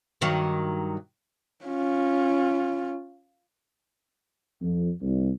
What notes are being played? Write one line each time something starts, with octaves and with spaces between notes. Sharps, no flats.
G2 D#3 F#3
C#4 F4
F2
C2